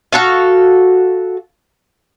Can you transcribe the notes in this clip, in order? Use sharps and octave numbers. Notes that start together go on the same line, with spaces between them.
F#4 A4 F5